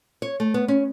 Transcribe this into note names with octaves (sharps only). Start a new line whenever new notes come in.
C#5
A3
B3
C#4